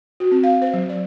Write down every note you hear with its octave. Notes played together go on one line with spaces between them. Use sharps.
F#4
C4
F5
C5
F#3
D5